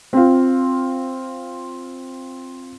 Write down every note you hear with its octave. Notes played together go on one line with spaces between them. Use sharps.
C4 F4